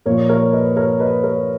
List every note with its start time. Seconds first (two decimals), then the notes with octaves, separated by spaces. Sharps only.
0.06 A#2 F3 A#4 C#5
0.29 A#4 C#5
0.53 B4 D#5
0.76 A#4 C#5
1.00 B4 D#5
1.23 A#4 C#5